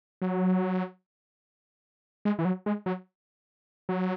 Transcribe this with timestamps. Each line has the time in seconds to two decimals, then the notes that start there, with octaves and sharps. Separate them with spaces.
0.22 F#3
2.25 G#3
2.39 E3
2.45 F#3
2.66 G#3
2.86 F#3
3.89 F#3